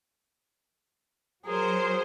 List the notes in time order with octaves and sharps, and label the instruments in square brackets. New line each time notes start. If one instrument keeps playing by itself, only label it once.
[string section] F#3 C5 [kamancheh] G#4 A#4